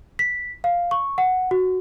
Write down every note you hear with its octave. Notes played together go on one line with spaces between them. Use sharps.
B6
F5
C#6
F#5
F#4